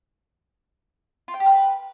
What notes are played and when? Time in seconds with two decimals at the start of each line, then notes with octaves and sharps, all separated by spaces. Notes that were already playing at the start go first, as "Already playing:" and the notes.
1.28 F4
1.34 G5
1.40 G4
1.46 A#4
1.52 B4